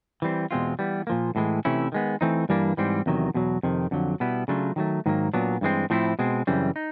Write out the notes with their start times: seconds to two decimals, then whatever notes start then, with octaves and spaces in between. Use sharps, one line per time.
0.22 E3 G3 C4
0.51 E2 B2 G#3 C4 F4
0.79 E3 G3 B3
1.07 A#2 F3 A#3
1.36 A2 E3 G#3
1.65 C3 E3 A3 C#4 E4
1.92 D#3 G#3 B3
2.21 E3 A3 C4 D#4
2.49 G2 E3 G3 A#3 D4
2.77 G#2 E3 G3 C4
3.06 E2 C3 D#3 F#3
3.34 E2 B2 F#3
3.63 F2 C3 D#3
3.91 F2 D3 F#3
4.20 B2 G3 B3 E4
4.48 C#3 F#3 A3 D4 F4
4.76 D#3 F#3 A3
5.06 G#2 D#3 F#3 A#3
5.34 A#2 F#3 B3 D4
5.61 G2 E3 G#3 C4
5.90 A2 F3 A3 C4 E4
6.19 B2 G#3 C4
6.47 F#2 C#3 E3 G3 C4
6.76 D#4